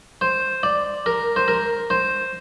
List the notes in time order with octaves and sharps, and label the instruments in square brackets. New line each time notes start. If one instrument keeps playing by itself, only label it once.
[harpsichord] C5
D5
A#4
C5
A#4
C5